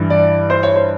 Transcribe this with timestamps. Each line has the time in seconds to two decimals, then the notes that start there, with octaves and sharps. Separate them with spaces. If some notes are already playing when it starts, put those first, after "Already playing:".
Already playing: G2 E3 G3
0.10 D5
0.50 C5
0.63 C#5
0.76 C5